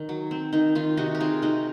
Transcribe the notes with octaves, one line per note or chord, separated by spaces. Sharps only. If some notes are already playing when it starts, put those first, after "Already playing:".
Already playing: D#3 D#4
F#3
C4
D#3 D#4
D#3 F4
C3 D#4 F#4
A#4
C4 F4 G#4
C3 D#4 F#4